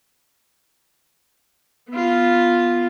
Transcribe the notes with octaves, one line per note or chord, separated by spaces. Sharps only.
B3 F4